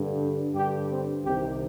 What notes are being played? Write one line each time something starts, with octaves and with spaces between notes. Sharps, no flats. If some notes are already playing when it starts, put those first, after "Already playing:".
Already playing: G2 D3
G2 D3 G4
C4
C2 C3 D#3 G4